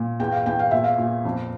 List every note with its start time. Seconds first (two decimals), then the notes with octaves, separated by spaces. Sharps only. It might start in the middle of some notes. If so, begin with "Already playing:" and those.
Already playing: A#2
0.20 E2 G5
0.32 F5
0.46 E2 G5
0.59 F5
0.71 A#2 E5
0.84 F5
0.98 A#2
1.25 F2